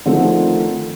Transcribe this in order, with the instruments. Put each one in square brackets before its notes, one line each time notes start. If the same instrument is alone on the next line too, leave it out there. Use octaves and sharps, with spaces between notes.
[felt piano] D3 D#3 F3 A3 C4 E4